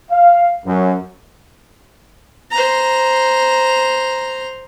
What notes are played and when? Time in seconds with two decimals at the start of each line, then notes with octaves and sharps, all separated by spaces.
0.11 F5
0.66 F#2
2.51 C5 A#5